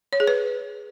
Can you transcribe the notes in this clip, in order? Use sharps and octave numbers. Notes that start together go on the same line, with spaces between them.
C#5
G#4
B4